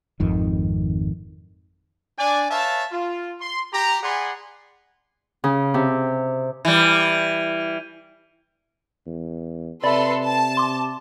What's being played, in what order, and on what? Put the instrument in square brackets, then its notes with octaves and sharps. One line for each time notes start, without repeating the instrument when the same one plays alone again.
[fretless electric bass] G#1 F2 D#3
[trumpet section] D4 D5 G#5
B4 C#5 E5 F5 A5
F4
C6
G4 A#5
G#4 D5 F#5 G#5 B5 C6
[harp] C#3
C3
[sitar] E3 G3
[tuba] E2
[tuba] C3 [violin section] A4 B4 C6 [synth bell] D5 [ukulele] E5 B5
[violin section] A5
[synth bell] C6 D6